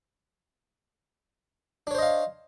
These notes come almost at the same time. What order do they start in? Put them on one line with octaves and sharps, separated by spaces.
D4 C#5 C5 D#5 F5